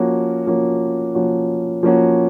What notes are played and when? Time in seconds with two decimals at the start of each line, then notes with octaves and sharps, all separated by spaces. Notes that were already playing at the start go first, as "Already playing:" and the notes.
Already playing: F3 A#3 C#4 F#4
0.47 F3 A#3 C#4 F#4
1.15 F3 A#3 C#4 F#4
1.83 F3 A#3 C#4 F#4